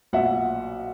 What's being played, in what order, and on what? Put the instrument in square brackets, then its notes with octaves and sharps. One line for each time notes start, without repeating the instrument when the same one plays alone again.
[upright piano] B1 A#2 F#3 E5 F#5